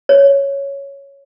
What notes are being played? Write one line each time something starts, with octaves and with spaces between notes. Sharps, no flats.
C#5